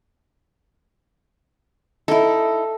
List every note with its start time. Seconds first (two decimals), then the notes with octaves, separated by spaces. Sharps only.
2.08 D#4 E4 A4